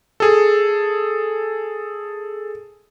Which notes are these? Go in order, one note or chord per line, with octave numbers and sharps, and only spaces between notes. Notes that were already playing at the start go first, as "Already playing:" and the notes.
G#4 A4